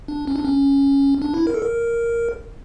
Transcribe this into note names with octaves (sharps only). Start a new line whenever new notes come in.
D4
C#4
D4
C#4
D4
E4
A#4
A4
A#4